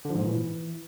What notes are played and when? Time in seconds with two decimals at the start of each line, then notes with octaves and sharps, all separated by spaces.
0.05 D3
0.10 F3
0.15 G#2
0.20 A#2
0.25 E3